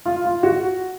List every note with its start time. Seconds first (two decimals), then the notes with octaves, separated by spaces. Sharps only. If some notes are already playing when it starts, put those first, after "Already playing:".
0.06 F4
0.24 F4
0.43 F#4